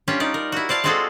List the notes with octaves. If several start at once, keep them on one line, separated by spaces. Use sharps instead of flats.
G3 C#4 D4 F4 G4
D#4 D5
A#4
E4 F#4
C5 D5 F5 A5
G#3 C4 F4 F#4 G#4 A4